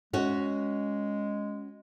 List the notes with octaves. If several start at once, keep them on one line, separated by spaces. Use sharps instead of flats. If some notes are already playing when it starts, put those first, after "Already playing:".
G#3 C#4 F#4